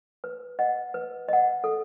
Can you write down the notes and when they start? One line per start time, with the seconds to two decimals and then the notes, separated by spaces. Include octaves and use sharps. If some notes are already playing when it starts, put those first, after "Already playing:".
0.24 B4
0.59 D#5 F#5
0.94 B4
1.29 D#5 F#5
1.64 A4